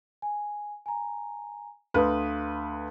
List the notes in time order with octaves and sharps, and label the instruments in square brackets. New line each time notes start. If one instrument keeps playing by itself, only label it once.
[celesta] G#5
G#5 A#5
[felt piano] D2 B4 [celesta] F5 C6 D#6